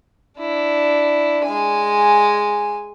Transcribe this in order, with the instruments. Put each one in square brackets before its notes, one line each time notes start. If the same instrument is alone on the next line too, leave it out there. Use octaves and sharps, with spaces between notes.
[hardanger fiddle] D4 E4
G#3 G#5